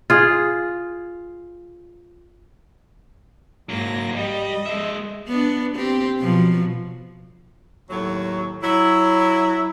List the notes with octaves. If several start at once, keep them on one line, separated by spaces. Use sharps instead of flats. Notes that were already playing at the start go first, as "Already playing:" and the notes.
F4 G#4
G#2 F#3 A#3 A#6
G3 D#5
G#3 E5
B3 D4
C4 G4
B2 F3 F#3
D#2 A2 F#3
F#3 E4